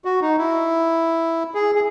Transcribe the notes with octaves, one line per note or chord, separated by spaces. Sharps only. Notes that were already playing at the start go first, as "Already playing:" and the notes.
F#4
D#4
E4
G#4
G#4